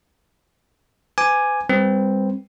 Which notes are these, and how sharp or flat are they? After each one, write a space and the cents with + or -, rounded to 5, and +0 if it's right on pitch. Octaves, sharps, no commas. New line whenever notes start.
B4 +45 G#5 +0 D6 +10
G3 +30 C4 +0 B4 -15